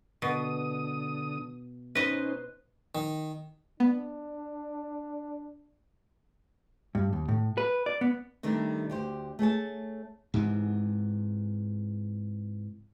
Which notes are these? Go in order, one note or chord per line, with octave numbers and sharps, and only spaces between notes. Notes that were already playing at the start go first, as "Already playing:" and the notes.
B2 D3 D#6
C#4 D#4 B4 C5 D#5
D#3
B3 D4
G2
D#2
A2
B4
D5
B3
C3 D#3 G3 A3 D4
D2 G4 C5
A3 G#4 C#5 A5
G#2 C3 E3